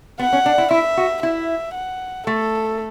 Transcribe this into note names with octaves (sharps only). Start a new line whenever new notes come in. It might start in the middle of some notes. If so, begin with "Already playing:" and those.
B3 F#5
C#4
D4
E4
E4 E5
F#4
E4 E5
F#5
A3 A4